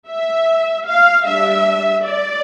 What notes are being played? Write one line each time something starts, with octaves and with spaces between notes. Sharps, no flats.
E5
F5
G3 D4 E5
D5